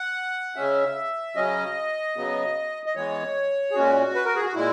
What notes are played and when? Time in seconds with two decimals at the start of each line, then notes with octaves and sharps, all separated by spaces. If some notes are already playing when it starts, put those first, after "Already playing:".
Already playing: F#5
0.56 C#3 G#3 C#4 E5
1.35 C#3 F#3 C#4 D#5
2.16 C#3 F#3 B3
2.86 D#5
2.95 E3 G#3 B3 C#5
3.71 G#4
3.75 A#2 G#3 C#4 F#4
4.15 B4
4.25 A#4
4.35 G#4
4.45 F#4
4.54 A#2 G#3 E4